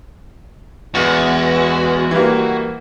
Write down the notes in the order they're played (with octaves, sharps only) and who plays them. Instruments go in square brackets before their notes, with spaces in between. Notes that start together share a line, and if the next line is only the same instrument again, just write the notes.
[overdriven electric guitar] E2 [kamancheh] G#3 B4 [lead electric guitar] F#4
[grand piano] E3 G3 A#3